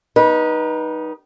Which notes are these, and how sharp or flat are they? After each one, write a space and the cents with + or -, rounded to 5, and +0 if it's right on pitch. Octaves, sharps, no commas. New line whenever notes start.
G3 -35 D#4 +0 B4 -30